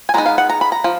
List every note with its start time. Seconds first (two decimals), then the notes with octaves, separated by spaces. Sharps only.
0.09 G#5
0.14 D#3 G#3 B3 D#4 A#5
0.26 F5
0.38 F#5
0.50 A#5
0.61 B5
0.72 A#5
0.84 F3